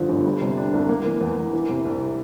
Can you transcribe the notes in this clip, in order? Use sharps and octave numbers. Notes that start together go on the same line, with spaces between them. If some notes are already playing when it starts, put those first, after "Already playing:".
Already playing: G2 D3 F3
G1
G3
C3
D4
C2
A#3
E3
E2
E2
E3
C3
C2